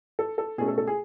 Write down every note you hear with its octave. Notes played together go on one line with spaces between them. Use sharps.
A4
A4
B2 A3 C#4 G#4
A4
A4
G#4